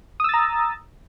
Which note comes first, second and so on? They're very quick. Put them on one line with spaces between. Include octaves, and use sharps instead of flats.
D#6 E6 A6 A#5